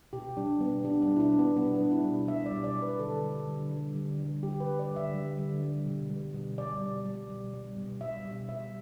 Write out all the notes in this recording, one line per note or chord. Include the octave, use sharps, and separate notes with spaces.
B2 G4
G3 D4
B2 B3
G3 D4
D4
B2
E4
D4
G3
B3
B2 B3
D4
G3
E4
B2
G3 E5
D5
B2
D5
G3
B4
D3 A4
G3
D3
G3
D3
G3
D3 G4
B4
G3
D5
D3
E5
G3
D3
G3
B2
G3
B2
G3 D5
B2
G3
B2
G3
B2
G3 E5
B2
G3 E5